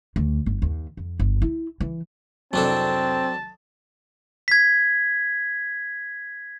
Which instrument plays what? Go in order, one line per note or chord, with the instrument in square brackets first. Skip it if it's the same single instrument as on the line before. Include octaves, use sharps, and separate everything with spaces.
[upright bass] D2
G1
D#2
F2
G1
E4
E3
[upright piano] C2 F2 [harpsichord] F#3 D4 A4 [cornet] C4 [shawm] A5
[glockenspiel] G#6 B6